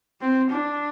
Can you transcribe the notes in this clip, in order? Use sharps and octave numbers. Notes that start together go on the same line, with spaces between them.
C4
D4